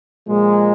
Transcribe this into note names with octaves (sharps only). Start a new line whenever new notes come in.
A#2 F3 G#3